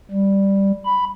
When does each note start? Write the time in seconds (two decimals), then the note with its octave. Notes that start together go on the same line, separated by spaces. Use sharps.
0.11 G3
0.85 B5